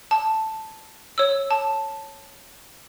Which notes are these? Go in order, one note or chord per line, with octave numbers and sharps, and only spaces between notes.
A5
C#5 E6
A5